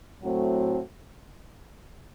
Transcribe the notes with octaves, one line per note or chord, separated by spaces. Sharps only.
A2 F#3 A3 C4 F#4